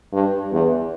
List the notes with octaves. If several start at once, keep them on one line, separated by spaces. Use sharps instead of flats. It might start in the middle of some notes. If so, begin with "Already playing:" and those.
G2
E2